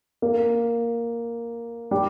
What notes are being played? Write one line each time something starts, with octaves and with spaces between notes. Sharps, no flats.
A#3
G3